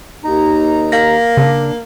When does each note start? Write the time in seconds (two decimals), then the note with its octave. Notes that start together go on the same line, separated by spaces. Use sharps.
0.24 D#2 D#4 A#5
0.92 A#3 F5 A#6
1.37 C#3 D4